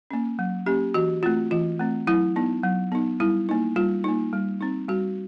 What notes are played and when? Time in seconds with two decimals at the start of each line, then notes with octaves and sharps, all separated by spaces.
0.11 A#3 C#4
0.39 F#3
0.66 A#3 C#4 G4
0.94 E3 F#4
1.23 A3 C4 F4
1.51 E3 F4
1.79 A3 C4
2.07 F#3 E4
2.36 B3 D#4
2.63 F#3
2.92 B3 D#4
3.20 G3 E4
3.49 A#3 D#4
3.76 G3 F4
4.04 A#3 D#4
4.33 G3
4.61 C4 D#4
4.88 G3 F#4